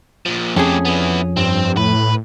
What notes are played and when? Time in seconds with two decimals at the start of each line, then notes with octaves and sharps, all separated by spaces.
0.26 A#2 F3
0.56 F2 A3 C#4 G4 G#4
0.85 B3 E4
1.37 G2 C4
1.77 A2 B4